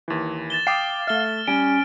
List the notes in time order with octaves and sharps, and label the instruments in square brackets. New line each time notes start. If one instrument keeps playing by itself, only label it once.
[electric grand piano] D#2 E3
[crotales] A6 E7 G7
[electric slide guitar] F5 [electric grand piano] G5 D6 D#6
[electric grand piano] A3 E5 [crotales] F6 G7
[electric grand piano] G3 [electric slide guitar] C#4 [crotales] D7